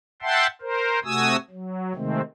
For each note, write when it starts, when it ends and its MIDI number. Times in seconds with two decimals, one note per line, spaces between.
0.22 0.47 76
0.22 0.47 78
0.22 0.47 79
0.22 0.47 81
0.22 0.47 84
0.61 0.99 70
0.61 0.99 72
1.04 1.36 48
1.04 1.36 57
1.04 1.36 66
1.04 1.36 80
1.04 1.36 87
1.04 1.36 88
1.50 1.93 54
1.95 2.21 48
1.95 2.21 51
1.95 2.21 56
1.95 2.21 57
1.95 2.21 60